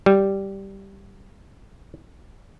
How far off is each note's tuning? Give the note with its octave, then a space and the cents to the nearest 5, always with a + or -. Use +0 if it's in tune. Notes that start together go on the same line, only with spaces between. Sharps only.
G3 -5